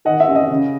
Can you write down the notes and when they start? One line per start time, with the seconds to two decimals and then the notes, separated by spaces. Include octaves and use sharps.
0.05 D#3 D#5 F#5
0.20 E5
0.28 C#4
0.35 D#5
0.50 C#3